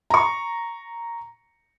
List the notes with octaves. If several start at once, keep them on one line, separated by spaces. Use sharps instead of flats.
A#5 C#6